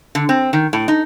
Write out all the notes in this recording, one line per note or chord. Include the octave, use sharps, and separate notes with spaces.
D3
C4
D#3
A2
D#4